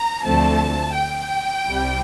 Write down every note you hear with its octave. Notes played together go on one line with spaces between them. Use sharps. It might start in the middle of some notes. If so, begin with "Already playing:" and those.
Already playing: A#5
D2 D3 F3 A3 C4 A5
G5
C2 C3 G3